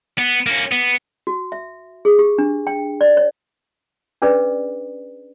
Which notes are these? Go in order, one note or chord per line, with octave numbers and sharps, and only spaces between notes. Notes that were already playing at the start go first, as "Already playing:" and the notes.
B3
A#3 C#4
B3
F#4
E5
G#4
G4
D4
G5
D5
C#5
C#4 D4 G#4 B4 D5